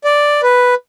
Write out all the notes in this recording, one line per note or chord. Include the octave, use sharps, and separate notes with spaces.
D5
B4